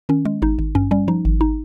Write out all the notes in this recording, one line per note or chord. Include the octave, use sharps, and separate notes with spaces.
D#3 C#4
G#3
G#1 D#4
G#1
G2 C#4
G3 C#4
F3 D#4
G#1
D#4